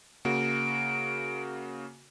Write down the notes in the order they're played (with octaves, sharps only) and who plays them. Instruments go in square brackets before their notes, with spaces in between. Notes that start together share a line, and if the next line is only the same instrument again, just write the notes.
[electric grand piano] C#3 A#3 F#4 [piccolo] D7